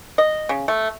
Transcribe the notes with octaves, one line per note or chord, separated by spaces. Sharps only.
D#5
C#3
A3